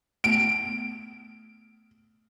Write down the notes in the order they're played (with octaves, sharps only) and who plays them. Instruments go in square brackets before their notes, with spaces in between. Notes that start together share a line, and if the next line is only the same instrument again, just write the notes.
[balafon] A3 B3 [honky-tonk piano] D7